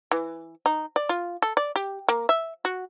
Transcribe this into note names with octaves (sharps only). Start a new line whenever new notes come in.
E3
D#4
D5
F4
A4
D5
G4
A#3
E5
F#4